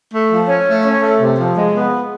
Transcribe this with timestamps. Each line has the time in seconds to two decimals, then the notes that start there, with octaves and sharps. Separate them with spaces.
0.11 A3
0.30 F3
0.48 C#4
0.66 A3
0.84 C#4
1.01 A3
1.20 C3
1.38 F3
1.56 G#3
1.73 B3